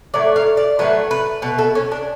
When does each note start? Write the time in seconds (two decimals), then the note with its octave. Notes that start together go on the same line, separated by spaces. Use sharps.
0.14 A2 F#3 A3 D5
0.36 F5
0.57 D5
0.79 A2 F#3 A3 B4
1.11 B4
1.42 B2 B4
1.46 A3
1.58 A4
1.75 C#4
1.92 D4